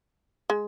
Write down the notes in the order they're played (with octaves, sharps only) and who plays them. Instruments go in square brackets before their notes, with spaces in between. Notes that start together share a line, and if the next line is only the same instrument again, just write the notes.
[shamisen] G#3